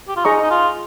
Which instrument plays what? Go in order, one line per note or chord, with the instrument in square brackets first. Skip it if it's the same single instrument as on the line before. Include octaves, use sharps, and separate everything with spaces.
[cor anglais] G4
F4
[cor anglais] D#4 [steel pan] G#4 D#5 A#5 C#6
[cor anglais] D#4
F4